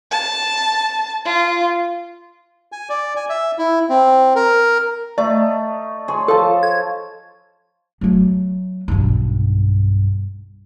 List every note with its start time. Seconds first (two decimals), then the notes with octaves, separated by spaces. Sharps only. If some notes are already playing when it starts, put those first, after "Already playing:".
0.12 A5
1.25 F4
2.72 G#5
2.89 D5
3.16 G#5
3.30 E5
3.59 E4
3.90 C4
4.36 A#4
5.18 A3 D#4 D5
6.08 G#4 C#5 C6
6.28 F3 A4 A5
6.63 G#6
8.01 F#3 A3
8.88 B1 G2